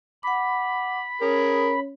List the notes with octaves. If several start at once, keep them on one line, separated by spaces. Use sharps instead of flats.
F#5 B5 D6
C#4 G#4 A#4 C#5